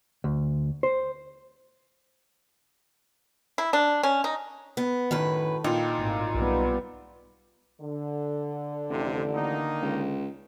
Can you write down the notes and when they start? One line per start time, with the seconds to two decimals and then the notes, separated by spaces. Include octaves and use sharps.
0.24 D2
0.83 C5
3.58 E4
3.73 D4
4.03 C#4
4.24 D#4
4.77 B3
5.11 F#2 A2 D#3 B4
5.64 A#2 D#4 F4 G5
5.96 G#1 A2
6.35 B1 G3 B3
7.81 D3
8.89 A1 F2 C3
9.32 D#3 A#3 D#4
9.82 C#2